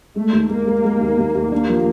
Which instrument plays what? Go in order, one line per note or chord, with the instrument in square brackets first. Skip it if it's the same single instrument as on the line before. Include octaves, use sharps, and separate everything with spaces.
[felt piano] G#3 [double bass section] A3
[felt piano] D#2
[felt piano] G#3 [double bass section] A#3
[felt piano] G#3
G#3
D#2
D#2
D#2
[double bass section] A#3 [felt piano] D4
[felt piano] F3